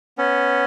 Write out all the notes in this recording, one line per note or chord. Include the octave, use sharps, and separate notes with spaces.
B3 C#4